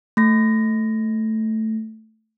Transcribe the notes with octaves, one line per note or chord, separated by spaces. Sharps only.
A3 A#6